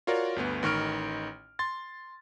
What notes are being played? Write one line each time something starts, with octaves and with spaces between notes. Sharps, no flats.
F4 F#4 A#4 C#5 D5
G1 D2 B3
A1 D#3 C#6 F6 D7
C6 A6